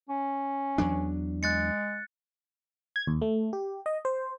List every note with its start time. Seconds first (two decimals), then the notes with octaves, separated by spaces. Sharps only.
0.09 C#4
0.78 E2 F#3 D4
1.43 G#3 F#6 A6 C#7
2.96 G#6
3.07 D#2
3.22 A3
3.53 G4
3.86 D#5
4.05 C5